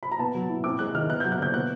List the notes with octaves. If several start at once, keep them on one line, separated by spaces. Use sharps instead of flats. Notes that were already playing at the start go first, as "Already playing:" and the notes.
B5
A#5
B3 A5
F#3
E4
C4 D6
G#3 F#6
D#3 F6
B3 F#6
G6
F#3
F#6
D3 G6
B3 F#6